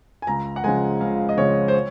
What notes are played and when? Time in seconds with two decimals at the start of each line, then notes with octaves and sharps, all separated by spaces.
0.22 G#5
0.27 C#2 A#5
0.56 F#5
0.64 C#3 F3 G#3 G#5
1.00 C#2 F5
1.29 D#5
1.38 C#3 F3 G#3 C#5
1.68 C5
1.74 C#5